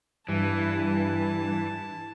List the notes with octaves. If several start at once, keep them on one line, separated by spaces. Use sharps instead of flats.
G2 E3 A5